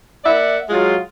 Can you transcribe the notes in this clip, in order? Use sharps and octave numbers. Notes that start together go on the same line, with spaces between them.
A#3 D5 E5 F#5
F#3 G#3 F4